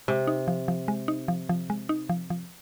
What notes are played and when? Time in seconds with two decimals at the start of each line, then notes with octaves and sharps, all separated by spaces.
0.08 C3 G#3
0.27 D#4
0.48 F3
0.68 F3
0.88 G#3
1.08 D#4
1.28 F3
1.49 F3
1.70 G#3
1.89 D#4
2.09 F3
2.30 F3